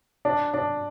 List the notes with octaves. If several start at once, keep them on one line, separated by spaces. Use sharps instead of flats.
D4
D4